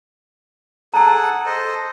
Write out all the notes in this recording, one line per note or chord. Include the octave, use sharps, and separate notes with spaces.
G#4 A4 F#5 A5 A#5
A4 C5 D#5